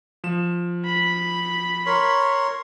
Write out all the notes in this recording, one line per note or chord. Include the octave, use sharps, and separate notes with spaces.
F3 E7
B5
A#4 C#5 C6